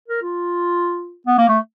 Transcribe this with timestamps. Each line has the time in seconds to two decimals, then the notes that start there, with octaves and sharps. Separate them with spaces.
0.08 A#4
0.22 F4
1.27 B3
1.38 A#3
1.49 A3